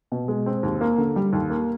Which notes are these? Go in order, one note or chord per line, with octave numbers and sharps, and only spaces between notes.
B2
G#3
C4
D#2
A#3
D3
G3
D#2
A#3